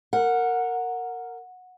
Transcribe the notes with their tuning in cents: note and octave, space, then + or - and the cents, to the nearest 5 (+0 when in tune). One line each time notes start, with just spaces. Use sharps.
A#4 -15 F#5 -15